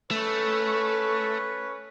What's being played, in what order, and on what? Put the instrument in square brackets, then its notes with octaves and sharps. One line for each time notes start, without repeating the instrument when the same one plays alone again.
[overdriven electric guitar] A3 [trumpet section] C#4 B4 C#6